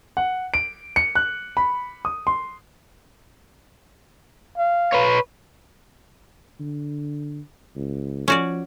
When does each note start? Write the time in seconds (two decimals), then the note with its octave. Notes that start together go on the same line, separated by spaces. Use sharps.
0.17 F#5
0.54 D7
0.96 C#7
1.15 F#6
1.57 B5
2.05 D#6
2.27 C6
4.58 F5
4.93 B4 C#5
6.60 D3
7.76 C#2
8.28 F3 C#4 F#4 D5